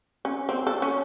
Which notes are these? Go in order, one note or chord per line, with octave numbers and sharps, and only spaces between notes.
C#4
C4
A4
C#4